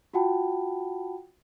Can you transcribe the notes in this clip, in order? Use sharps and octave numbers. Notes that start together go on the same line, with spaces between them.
F4 F#4 F#5 G5 A5 B5